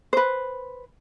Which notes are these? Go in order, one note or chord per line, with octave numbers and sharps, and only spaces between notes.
B4 C5